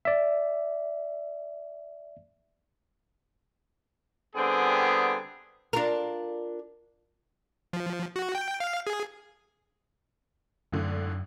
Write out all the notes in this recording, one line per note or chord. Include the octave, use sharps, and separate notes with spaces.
D5 E5
D3 G3 B3 C4 G#4
D4 F4 A#4
F3
F#4
G5
F5
G#4
G#1 F#2 A2 D3